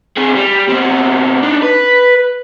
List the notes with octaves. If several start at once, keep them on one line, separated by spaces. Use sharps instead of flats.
C4 G#4
G3
B2 C4
D4 D#4
B4